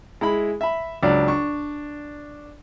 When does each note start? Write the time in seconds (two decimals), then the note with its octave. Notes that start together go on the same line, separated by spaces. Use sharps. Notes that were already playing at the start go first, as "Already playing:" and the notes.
0.21 G#3 E4 B5
0.61 E5 B5
1.03 C#2 F#3 D4 D5
1.28 D4 C#6